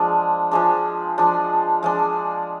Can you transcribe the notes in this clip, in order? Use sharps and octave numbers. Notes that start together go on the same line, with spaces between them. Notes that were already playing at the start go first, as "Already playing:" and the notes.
Already playing: F3 G#3 D4
F3 G#3 D4
F3 G#3 D4
F3 G#3 D4